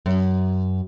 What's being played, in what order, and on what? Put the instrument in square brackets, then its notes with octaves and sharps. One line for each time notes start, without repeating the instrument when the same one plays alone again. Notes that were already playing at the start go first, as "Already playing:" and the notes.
[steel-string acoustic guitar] F#2